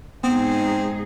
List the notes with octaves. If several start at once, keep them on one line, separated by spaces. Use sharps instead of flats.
G#2 B3 C4 D#4 G#4